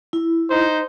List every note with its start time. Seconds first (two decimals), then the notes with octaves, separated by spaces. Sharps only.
0.13 E4
0.49 D#4 C5